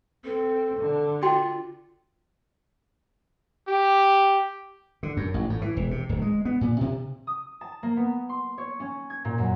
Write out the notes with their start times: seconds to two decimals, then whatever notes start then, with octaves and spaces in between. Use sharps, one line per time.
0.24 C4 A4
0.80 D3
1.22 F4 F#4 G5 C6
3.68 G4
5.03 D3
5.17 F#2
5.34 A1
5.50 A2
5.62 E3
5.77 E1
5.91 C3
6.09 D1
6.22 G#3
6.45 B3
6.61 A#2
6.81 C3
7.27 D#6
7.61 A5
7.83 A#3
7.97 B3
8.29 C6
8.58 C#5
8.80 C#4
9.10 G#6
9.25 A#2
9.38 F#2